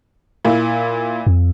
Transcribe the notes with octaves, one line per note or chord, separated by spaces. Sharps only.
A#2 E4
F2